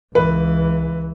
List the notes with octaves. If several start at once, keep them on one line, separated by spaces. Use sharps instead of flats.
C#2 E3 B4